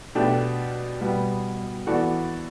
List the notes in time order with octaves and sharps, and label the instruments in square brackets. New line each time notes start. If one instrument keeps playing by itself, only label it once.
[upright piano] B2 A3 D4 G4
B2 G3 B3
E3 B3 F#4 A4 D5